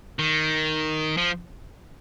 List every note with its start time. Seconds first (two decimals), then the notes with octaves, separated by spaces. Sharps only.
0.19 D#3
1.17 F3